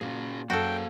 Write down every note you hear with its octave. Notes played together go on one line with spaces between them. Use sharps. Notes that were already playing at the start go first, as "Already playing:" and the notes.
A#2 C#4 F#4 G#4
F#2 A#3 F#4 G#4 A4 F5 G5